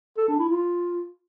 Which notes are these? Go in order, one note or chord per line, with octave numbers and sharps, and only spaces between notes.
A4
D4
E4
F4